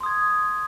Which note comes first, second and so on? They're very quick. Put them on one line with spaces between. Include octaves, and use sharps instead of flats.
C6 D#6 G#6